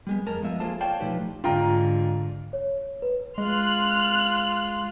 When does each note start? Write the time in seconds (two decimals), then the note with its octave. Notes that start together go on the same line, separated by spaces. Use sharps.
0.07 G3 G#3 B3
0.27 F2 G#3 A#4 A5
0.42 F3 G#3 B3 E5
0.60 A#3 F4 G#4 A4 C5 A5
0.80 C#5 D5 F5 G5 A5
1.00 B2 F3 A3 D#4 G4 B4
1.44 G#2 D3 F4 G5 A#5
2.53 C#5
3.02 B4
3.38 G#3 F4 C6 F6 F#6